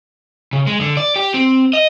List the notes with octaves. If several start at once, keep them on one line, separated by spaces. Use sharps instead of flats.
C#3
G#3
D3
D5
G4
C4
D#5